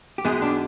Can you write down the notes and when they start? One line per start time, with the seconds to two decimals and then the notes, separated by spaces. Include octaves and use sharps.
0.18 G4
0.24 F#2 D#3 G#3 B3 G#4
0.42 D4